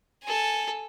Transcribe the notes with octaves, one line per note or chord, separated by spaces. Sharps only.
A4 G#5